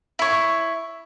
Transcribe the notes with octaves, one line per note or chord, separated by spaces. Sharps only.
E4 C#5